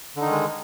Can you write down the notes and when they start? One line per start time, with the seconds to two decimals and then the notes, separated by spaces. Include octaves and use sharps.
0.16 D3
0.21 D#4
0.26 D#3
0.31 G#3